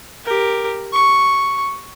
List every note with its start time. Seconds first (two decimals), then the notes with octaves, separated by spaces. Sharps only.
0.25 G4 A#4
0.92 C#6